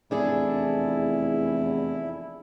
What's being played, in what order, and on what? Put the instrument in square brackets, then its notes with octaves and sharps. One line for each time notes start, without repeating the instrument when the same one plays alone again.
[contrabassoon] F1 [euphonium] E2 [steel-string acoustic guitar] D4 G#4 A4 [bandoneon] E4